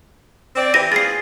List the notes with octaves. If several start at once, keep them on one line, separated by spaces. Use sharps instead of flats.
C4 D5
E3 G4 A#6 D#7
F4 G#4 A6 C7